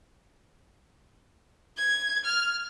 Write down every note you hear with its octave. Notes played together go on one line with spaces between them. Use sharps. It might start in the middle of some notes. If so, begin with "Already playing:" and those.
G#6
F6